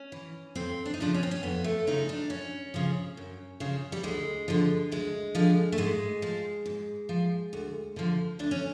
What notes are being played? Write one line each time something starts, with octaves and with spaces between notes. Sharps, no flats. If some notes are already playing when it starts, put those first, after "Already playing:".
Already playing: C#4
E3
F2 C4
D4
D#4
C#3 F3 D4
C#4
C4
C#4
F2 B3
A3
C#3 F3 D#4
D4
F#2 C#4
C#3 F3
F#2
C#3 F3
G3
D2 G#3
D3 F3
D2 G#3
D3 F3
A3
G#2 G#3
F3
G#2
F3
D2
D3 F3
D2 D4
C#4